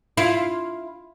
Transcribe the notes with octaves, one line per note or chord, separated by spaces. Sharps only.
E4 F4